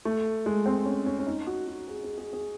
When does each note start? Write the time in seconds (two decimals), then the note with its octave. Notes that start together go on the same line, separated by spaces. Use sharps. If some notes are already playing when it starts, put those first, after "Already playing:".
0.05 A3
0.46 G#3
0.66 C4
0.85 C#4
1.06 C#4
1.19 C#4
1.27 D#4
1.47 F#4
1.67 F#4
1.88 G#4
2.04 G#4
2.18 G#4
2.33 G#4